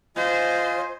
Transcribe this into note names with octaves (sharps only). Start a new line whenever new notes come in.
F4 C5 D#5 G#5